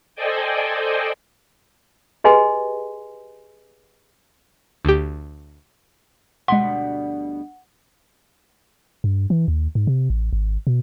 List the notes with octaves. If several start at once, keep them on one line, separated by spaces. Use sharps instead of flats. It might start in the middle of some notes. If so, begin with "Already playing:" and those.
A4 C5 D5 D#5 G5 G#5
G4 G#4 B4 D#5 G#5 C6
D2 G4
D2 B2 G3 G#3 F#5 C6
G2
E3
D#2
G#2
C3
A1
G#1
B2